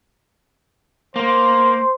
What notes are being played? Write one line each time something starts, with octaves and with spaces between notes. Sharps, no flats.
A#3 C5